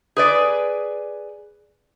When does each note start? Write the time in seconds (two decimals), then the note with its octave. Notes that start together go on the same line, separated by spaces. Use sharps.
0.17 G#4 B4 D5